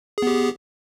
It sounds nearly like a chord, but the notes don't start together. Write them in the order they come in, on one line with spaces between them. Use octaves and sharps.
G#4 B3 G4